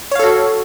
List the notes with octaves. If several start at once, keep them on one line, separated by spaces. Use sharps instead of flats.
F#4 A4 C#5 F5